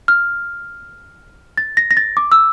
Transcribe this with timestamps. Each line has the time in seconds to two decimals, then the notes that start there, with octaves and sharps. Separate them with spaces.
0.08 F6
1.57 A6
1.77 A#6
1.91 A#6
1.97 A6
2.17 D6
2.32 E6